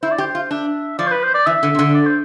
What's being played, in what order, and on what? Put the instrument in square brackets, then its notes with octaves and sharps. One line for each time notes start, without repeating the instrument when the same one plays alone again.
[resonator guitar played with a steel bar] E4 [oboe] C5
[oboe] D5
[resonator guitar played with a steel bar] G4 [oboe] C5
[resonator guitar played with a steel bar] F4
[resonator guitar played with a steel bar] D4 [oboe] E5
[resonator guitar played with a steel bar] F3 [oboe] D5
[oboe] C5
B4
C5
D5
[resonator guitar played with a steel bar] E3 [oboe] E5
[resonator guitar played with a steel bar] D3
C3
D3
[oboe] D5
C5